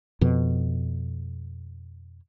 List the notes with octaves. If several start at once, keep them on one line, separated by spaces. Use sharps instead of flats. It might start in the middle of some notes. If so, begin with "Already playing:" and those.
F2 B2